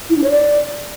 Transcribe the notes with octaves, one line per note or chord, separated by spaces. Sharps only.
E4
D4
C#5
D5